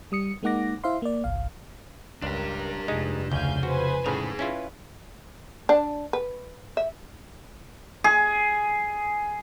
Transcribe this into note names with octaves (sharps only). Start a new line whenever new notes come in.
G3 D#6 C#7
G#3 A#3 D#4 F#5 D6 A#6
E4 C5 E5 F5 C6
A#3 D5
G1 C2 F5
C#2 D4 G4 A#4
F1 F2 G#3 D#4
D2 C#3 F5 G#5 G6
F#4 B4 C5 G#5
A2 C#3 D#4 G#4 A#5
C#4 E4 F4 B4
D4
B4
E5
G#4